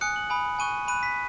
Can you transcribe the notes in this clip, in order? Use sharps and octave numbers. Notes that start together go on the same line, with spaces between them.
G#5 D#6 F#6 C#7
F#7
G#5 B5 D#6
G#5 C#6 F#6 D#7
B5 F#6 D#7
B6